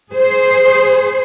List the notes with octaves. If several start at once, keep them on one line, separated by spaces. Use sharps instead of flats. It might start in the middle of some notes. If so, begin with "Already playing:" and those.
G#4 C5